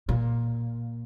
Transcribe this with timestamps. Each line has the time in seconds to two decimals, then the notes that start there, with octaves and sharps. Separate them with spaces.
0.09 A#2